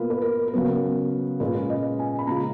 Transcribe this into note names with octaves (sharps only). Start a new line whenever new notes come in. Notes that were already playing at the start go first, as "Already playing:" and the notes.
Already playing: B2 A#3 F4 B4
B4
A#4
A#4
C#3 F#3 B3
A#2 G#3 C#4 F4 B4
D#5
G#5
B5
C#3 G#3 C#4 F4 A#5